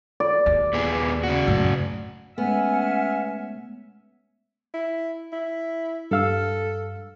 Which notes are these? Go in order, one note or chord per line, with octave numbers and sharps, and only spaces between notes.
D5
D#2
A#2 B3 G#4
C#3 F#4
F#2 A2
G#3 A3 B3 C#4 E5 F#5 G#5 F6
E4
E4
G2 A4 F5 E6